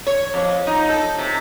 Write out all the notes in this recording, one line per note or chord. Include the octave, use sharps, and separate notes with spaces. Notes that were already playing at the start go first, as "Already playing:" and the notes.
C#5
F2
D#4
A4
C3